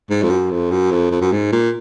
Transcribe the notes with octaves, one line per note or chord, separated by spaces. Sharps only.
G#2
F2
F#2
F2
F#2
F2
F2
F#2
G#2
A#2